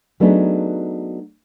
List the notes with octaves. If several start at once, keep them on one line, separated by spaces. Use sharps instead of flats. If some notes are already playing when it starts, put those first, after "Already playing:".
F#3 A3 B3 D4 D#4 G#4